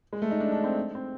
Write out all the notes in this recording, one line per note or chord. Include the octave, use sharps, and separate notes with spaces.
G#3
A3
D#4
D4
D4
C4
C4